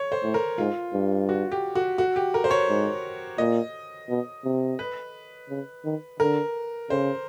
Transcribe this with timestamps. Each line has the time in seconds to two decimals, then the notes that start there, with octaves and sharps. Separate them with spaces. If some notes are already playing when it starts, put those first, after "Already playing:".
Already playing: C#5
0.12 C5
0.23 A2
0.34 A#4
0.58 G#2 F4
0.93 G2
1.29 F#4
1.52 G4
1.75 F#4
1.98 F#4
2.16 G4
2.34 A#4
2.44 C5
2.51 C#5
2.69 G#2
3.38 A#2 D#5
4.09 B2
4.44 C3
4.79 B4
5.49 C#3
5.85 D#3
6.19 D3 A#4
6.90 C#3 C5